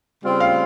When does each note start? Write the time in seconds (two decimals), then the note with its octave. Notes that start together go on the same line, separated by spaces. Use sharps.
0.23 C#3 G3 C4 F4
0.40 F5